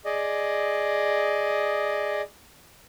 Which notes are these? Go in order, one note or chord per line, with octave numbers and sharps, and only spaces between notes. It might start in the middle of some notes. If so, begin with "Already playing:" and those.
G#4 D5 D#5